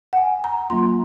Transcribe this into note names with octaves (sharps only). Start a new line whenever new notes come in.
F#5
G#5
A#5
F#3 A#3 C#4 F4 C6